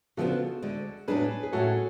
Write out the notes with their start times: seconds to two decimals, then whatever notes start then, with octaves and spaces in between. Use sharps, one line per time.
0.17 C#3 F3 G#3 B3 D4 F#4 A4
0.63 D2 D3 G#3
1.08 A2 F#3 B3 D4 G#4 B4
1.43 G#4
1.53 A2 F#3 C#4 F#4 A4